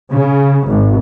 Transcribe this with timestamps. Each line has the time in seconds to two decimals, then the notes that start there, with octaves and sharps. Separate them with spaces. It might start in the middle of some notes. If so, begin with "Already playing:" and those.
0.12 C#3
0.67 G#1